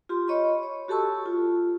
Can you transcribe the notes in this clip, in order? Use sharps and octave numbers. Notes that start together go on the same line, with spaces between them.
F4 G4 C6
C#5 D#5 B5 C#6
C#5
F#4 G4 A4 A5 C#6 E6
F4